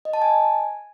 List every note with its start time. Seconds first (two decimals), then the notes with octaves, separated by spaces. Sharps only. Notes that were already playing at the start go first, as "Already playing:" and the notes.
0.05 D#5
0.13 A5
0.22 G#5